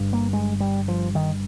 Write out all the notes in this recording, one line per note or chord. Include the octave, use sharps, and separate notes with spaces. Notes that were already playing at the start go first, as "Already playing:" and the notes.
Already playing: G1 G2
A#3
G#3
G3
F3
D#3